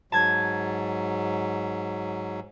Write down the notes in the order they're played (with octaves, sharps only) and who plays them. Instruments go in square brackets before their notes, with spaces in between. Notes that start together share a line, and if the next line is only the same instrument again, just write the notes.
[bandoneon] G#2 F#3 [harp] A5 G#6